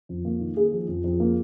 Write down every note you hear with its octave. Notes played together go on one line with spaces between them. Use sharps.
F2
A#3
D#3
A#3 G#4
F3
F2
F2
A#3